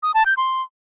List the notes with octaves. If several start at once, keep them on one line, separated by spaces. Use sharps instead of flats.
D#6
A5
G6
C6